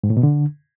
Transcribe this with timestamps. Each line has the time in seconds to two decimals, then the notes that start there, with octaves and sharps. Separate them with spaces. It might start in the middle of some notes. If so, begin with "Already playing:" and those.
0.04 G#2
0.10 A2
0.17 B2
0.23 D3